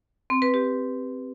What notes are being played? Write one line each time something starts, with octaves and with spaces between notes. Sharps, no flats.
C4
B4
G4